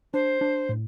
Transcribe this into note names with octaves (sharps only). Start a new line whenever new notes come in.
D4 C5
D4
A2